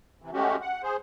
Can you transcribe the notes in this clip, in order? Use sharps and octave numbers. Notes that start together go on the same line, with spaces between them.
C3 E3
G#3 A3 C#4 F#4 G4
F#5
G#4 C5